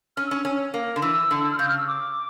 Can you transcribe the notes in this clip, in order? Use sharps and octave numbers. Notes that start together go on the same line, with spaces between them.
C#4 F6
C#4 E6
C#4
A#3
D3
E3 E6
D3
E6
F6
C#3 G6
F6
E6
D6